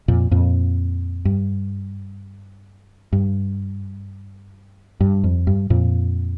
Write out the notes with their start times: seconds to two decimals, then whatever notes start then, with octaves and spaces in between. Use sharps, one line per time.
0.08 F2 A#2
0.31 F2 A#2
1.25 G2
3.13 G2
5.01 G2
5.24 F2
5.47 G2
5.70 F2 A#2